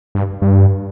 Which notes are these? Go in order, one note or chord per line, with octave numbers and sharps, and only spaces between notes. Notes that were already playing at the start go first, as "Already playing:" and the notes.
G2
G2